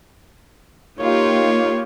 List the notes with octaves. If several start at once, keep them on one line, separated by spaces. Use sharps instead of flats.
A#3 D#4 F4 G4 C#5